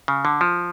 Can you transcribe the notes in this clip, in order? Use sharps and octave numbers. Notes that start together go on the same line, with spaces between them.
C#3
D3
F3